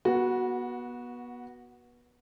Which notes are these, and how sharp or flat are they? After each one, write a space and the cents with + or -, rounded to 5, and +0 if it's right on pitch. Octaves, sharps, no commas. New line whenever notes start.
B3 -25 F#4 +0